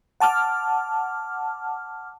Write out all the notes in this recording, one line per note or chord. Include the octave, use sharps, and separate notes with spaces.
F#5 A5 D6 F6